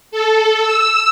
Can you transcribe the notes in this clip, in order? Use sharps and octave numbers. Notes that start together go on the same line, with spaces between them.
A4
E6